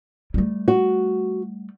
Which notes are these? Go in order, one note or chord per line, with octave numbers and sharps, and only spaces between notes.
G3 A3
F#4